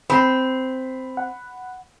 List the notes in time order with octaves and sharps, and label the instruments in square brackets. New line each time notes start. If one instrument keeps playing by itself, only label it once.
[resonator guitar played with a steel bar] C4 [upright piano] B5
[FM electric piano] F#5